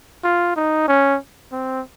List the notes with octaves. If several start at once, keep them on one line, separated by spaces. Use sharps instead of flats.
F4
D#4
C#4
C4